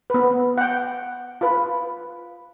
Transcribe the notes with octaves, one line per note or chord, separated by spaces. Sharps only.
B3 B4
F#5 G5
F4 B4